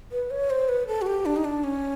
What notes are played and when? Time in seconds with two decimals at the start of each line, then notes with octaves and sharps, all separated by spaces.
0.12 B4
0.31 C#5
0.50 C5
0.69 B4
0.87 A4
1.02 F#4
1.06 G4
1.26 D4
1.36 D#4
1.44 D4
1.64 C#4